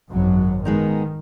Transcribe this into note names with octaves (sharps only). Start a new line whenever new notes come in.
G#1 F#2 F#3
D#3 G#3 B3 D#4